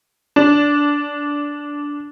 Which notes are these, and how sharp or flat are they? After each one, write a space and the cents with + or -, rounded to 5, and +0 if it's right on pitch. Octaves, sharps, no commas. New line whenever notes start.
D4 -10